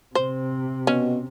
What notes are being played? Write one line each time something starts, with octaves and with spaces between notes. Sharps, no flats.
C3 C5
B2 C#4